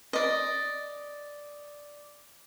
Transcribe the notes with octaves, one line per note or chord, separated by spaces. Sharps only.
D5 D#5